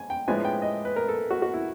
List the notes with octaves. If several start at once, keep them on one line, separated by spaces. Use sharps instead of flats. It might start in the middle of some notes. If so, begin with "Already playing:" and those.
Already playing: G#5
G5
A2 F3 G#3 B3 D4 G#5
G5
D#5
B4
A#4
A4
F#4
F#4
E4